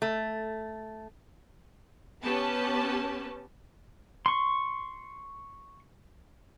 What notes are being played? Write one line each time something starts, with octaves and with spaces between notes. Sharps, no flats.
A3
B3 C#4 G4 B4 A5
C6 C#6